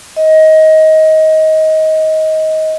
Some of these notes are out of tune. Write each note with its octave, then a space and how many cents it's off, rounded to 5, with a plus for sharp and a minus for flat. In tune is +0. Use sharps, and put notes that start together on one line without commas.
D#5 +20